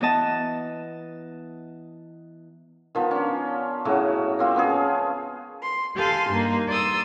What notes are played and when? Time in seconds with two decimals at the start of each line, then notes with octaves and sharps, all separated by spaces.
0.01 E3 B3 D#5 A5
2.95 D#3 F3 B3
3.11 C#4 D4
3.85 A2 C#3 F#3 F#4
4.39 A#3 C4 F4
4.55 F3 B3 C#4 G#4
5.62 C6
5.96 G4 A4 F5 G#5 C6
6.30 G2 G3 A#3 D#4
6.68 D5 C6 D#6 E6